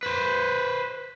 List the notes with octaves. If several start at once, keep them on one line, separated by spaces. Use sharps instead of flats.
B4 C5